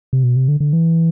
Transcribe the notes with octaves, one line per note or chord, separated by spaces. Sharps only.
C3
B2
C3
D3
D3
E3